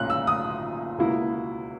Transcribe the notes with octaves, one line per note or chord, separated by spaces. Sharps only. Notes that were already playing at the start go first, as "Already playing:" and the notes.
Already playing: B1 A#2 C#4 F#6
E6
D#6
C#2 B2 A#3 E4